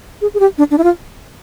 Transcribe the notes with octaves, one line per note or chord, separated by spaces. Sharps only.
G#4
G#4
G4
D4
D4
E4
F4